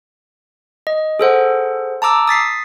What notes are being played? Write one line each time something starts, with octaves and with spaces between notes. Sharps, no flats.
D#5
G#4 A4 C5 F#5
A5 A#5 D6 E6
D#6 A6 B6 C7